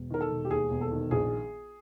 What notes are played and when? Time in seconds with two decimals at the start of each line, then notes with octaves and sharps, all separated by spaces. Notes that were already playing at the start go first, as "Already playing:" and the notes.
Already playing: E1
0.10 D#3 A#4
0.21 A4
0.31 E1
0.45 G4
0.50 D#2 G#4
0.70 E1
0.81 A4
0.91 D#3
1.11 A#1 G#4